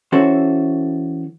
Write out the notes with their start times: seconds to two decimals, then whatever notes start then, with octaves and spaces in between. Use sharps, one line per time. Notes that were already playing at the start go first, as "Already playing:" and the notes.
0.12 E3 C#4 F#4 A4 C5